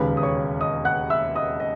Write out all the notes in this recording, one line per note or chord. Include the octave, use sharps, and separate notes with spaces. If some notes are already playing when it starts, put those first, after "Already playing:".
Already playing: E1 D#2 C#3 B4 B5
D#6
C#5 C#6
D#5 D#6
F#5 F#6
E5 E6
D#5 D#6
D#5